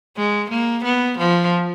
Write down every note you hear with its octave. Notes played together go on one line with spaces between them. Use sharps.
G#3
A#3
B3
F3